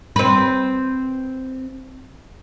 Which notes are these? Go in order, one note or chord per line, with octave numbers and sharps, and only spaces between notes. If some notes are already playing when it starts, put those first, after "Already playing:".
C4 B4